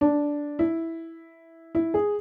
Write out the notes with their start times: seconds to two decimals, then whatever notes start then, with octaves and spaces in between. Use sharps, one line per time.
0.01 D4
0.59 E4
1.75 E4
1.94 G#4